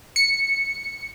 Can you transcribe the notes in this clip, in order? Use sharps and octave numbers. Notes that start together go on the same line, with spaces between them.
C#7